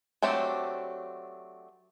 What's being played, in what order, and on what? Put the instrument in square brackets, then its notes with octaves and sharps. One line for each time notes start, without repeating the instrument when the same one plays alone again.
[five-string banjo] F#3 A3 C4 D4 G4